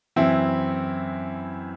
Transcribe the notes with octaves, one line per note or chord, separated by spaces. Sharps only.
F#2 E3 C4 E4